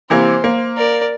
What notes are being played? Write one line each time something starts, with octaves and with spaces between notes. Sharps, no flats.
C3 E3 A#3 C5
A#3
A#4 D5